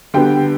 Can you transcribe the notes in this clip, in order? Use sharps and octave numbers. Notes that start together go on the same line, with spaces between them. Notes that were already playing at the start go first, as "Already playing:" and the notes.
D3 G3 B3 G5